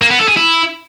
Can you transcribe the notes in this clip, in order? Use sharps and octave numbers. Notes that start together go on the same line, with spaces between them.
A#3
B3
A4
G#4
E4